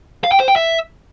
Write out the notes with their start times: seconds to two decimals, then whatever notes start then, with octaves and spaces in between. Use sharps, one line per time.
0.24 F5
0.32 G5
0.40 C5
0.48 G5
0.56 E5